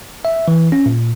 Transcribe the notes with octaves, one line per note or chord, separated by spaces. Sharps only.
E5
E3
C#4
A#2